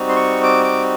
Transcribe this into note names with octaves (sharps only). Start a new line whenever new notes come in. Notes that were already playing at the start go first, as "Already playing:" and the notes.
Already playing: G3 C4 D#4 F#4
C6
C#6
D6
D6